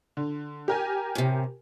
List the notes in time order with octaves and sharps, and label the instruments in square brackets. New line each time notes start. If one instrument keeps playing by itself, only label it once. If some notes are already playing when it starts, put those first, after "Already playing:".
[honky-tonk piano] D3
G4 A#4 G#5
[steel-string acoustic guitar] A2 C3